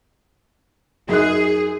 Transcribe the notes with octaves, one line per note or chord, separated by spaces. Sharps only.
F#2 D#4 G#4 F#6